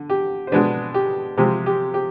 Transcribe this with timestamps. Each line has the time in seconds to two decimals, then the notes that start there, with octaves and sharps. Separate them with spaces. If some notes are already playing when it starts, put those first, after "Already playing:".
Already playing: D3
0.10 G4
0.47 C5
0.52 B2 G#3 D4 B4
0.94 G4
1.37 C3 F3 G#3 G4
1.66 G4
1.94 G4